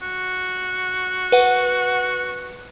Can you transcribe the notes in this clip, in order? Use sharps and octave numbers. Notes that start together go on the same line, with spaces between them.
F#4
B4 F#5